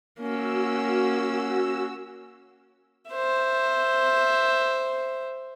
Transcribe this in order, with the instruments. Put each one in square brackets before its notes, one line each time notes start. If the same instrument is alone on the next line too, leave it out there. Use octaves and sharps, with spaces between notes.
[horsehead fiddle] A#3 C#4 [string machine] F#4 E6
[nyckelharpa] C5 E5